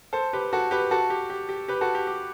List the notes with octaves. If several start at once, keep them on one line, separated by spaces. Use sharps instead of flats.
A4 C5
G4 B4
F#4 A4
G4 B4
F#4 A4
G4
G4
G4
G4 B4
F#4 A4
G4
G4